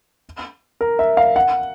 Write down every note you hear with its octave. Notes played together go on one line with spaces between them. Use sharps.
A#4
E5
F5
F#5